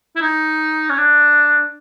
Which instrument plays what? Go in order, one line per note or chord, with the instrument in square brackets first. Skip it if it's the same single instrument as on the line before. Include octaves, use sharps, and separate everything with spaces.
[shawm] E4
D#4
C#4
D4